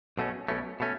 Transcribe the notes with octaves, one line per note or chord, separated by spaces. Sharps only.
B1 B2 A3 C#4
B1 B2 A3 C#4
B2 A3 C#4